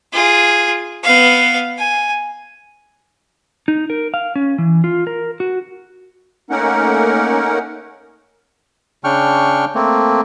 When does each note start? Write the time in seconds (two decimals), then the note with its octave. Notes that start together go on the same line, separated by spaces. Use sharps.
0.13 F4 G#4
1.03 B3 F5
1.78 G#5
3.68 D#4
3.90 A#4
4.14 F5
4.36 C#4
4.58 E3
4.84 F4
5.07 A#4
5.40 F#4
6.50 A3 A#3 C#4 D#4 A#4 F#5
9.04 C#3 D4 G5 C#6 F6
9.75 A3 A#3 C4